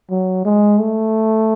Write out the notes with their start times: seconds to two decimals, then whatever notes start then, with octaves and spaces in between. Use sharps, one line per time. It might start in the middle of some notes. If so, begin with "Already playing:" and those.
0.10 F#3
0.45 G#3
0.79 A3